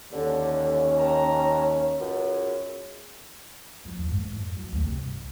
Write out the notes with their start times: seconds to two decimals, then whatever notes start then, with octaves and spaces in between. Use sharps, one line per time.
0.12 D#2 D3 C#4
0.98 G5 A5 A#5
1.99 C#2 F#2
3.85 F3
3.98 E2
4.11 G#2
4.32 F2
4.57 F#3
4.73 D2
4.84 C3
4.97 G2
5.17 C2